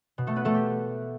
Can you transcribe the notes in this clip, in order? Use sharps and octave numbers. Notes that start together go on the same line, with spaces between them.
B2
A3 A4
B3 B4
A3 A4
G4